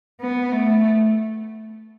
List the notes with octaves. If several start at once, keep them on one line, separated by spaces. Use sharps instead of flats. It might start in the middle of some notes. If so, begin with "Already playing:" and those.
B3
A3